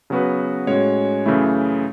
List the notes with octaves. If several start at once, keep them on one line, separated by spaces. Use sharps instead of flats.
C#3 F#3 B3 F#4 B4
A2 G#3 C#4 F#4 C#5
F#2 C#3 E3 A3 E4